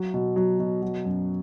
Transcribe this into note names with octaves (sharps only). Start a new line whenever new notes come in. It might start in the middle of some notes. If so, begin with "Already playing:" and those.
Already playing: F#3
B2
F#3
B2
F#3
F#2